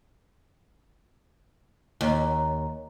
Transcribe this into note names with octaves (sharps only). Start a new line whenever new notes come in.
D#2 C#5 A#5